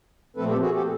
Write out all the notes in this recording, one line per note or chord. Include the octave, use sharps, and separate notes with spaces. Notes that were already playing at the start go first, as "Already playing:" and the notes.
A#2 F3 A3 C4 A4 B4
G4 A4
F#4 G#4
G4 A4